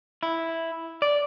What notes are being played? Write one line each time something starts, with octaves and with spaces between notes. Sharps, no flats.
E4
D5